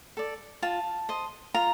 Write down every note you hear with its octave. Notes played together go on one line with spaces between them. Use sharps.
A4 D5
F4 A5
C5 D#5
F4 A#5